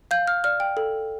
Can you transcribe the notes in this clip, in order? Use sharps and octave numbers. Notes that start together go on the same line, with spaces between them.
F5 G6
F6
D5 F6
G5
A4